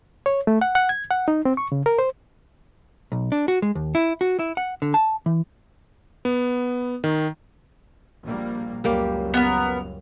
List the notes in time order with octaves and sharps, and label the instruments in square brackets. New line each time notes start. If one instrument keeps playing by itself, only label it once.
[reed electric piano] C#5
A3
F#5
F#5
G#6
F#5
D#4
C4
C#6
C#3
A#4
C5
[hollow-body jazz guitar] B1
D4
F#4
G#3
D#2
E4
F#4
E4
F#5
D3
A5
E3
[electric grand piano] B3
D#3
[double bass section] A#1 G3 A#3
[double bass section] C#2 F#2 [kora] G3 A#3 G4
[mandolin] B3 A#4